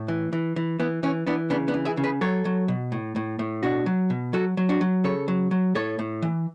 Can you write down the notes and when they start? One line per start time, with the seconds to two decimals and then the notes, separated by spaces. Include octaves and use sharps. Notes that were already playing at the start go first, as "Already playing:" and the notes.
Already playing: A2
0.08 E3
0.33 E3
0.56 E3
0.80 E3 B3
1.03 E3 C#4
1.27 E3 B3 D4
1.50 C#3 B3 D4
1.68 B3 D4
1.74 E3
1.85 E4 G#4
1.97 C#3
2.04 G#4 B4
2.21 F#3 A4 C#5
2.45 F#3
2.68 B2
2.92 A2
3.16 A2
3.39 A2
3.63 B2 D4 F#4
3.86 F#3
4.10 B2
4.33 F#3 F#4 A4
4.57 F#3
4.69 D4 F#4
4.81 F#3
5.04 C#3 A4 C#5
5.28 F#3
5.51 F#3
5.75 A2 A4 C#5
5.99 A2
6.22 E3